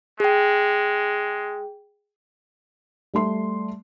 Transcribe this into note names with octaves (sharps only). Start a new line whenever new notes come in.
G#3 G#4 G5
G3 A3 C6